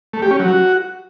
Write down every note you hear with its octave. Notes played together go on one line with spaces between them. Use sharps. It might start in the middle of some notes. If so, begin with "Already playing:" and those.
A3
G4
C#4
F#3
F#4